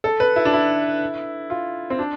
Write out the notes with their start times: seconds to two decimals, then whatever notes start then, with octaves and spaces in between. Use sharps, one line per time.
0.04 A4
0.20 B4
0.36 E4
0.45 D4
0.53 E4
1.50 F4
1.90 C4
1.99 D4